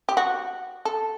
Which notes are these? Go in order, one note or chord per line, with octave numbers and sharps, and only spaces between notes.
G4
F#4
A4